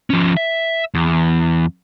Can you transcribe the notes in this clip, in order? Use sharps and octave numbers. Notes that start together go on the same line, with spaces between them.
F3 C#4
E5
E2